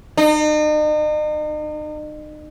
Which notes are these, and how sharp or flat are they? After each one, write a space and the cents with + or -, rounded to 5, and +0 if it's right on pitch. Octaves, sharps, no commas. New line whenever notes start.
D#4 -40